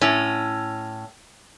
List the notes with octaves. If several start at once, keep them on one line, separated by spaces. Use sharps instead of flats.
A2 C#4